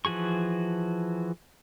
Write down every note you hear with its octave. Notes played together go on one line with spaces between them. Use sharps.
E3 F3 F#4 G#4 C#6